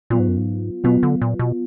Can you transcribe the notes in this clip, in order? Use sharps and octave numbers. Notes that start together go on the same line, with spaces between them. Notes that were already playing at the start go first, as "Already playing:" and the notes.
A#2 F#3 B3 F4
G#2
F#2
G#2
B2 F#3 B3 F4
D3
A#2
B2